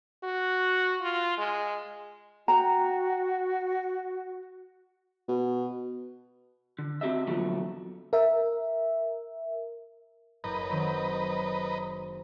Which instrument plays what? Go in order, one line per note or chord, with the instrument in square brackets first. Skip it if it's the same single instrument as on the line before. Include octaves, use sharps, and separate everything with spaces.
[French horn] F#4
F4
G#3
[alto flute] F#4 [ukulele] G5 A#5
[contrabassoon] B2
[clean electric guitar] D3
C4 F#4 G4 D#5 E5
E2 A#2 D3 F3 F#3 A3
[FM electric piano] A#4 E5
[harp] F#1 G6 [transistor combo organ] B4 D#5 A#5
[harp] D#3 F#3 C4